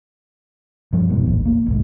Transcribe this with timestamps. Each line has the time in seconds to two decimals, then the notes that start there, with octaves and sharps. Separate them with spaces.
0.93 G2 F3 G3
1.09 F1 G#2 B2
1.26 A1 D#2
1.45 A#3
1.66 G1 C2 G#2